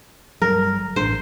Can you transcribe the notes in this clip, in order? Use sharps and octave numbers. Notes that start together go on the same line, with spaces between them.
G1 F#3 G3 A#4
A1 D4 C5